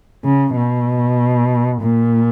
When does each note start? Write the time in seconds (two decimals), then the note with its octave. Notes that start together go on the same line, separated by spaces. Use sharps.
0.24 C#3
0.56 B2
1.82 A#2